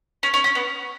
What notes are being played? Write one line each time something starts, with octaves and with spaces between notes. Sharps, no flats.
C#4
C#4
C#4
B3